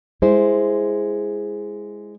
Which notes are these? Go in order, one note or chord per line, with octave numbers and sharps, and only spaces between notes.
G#3 E4 C5